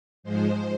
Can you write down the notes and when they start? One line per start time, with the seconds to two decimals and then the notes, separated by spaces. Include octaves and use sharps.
0.23 G#2 F3 G#3 C5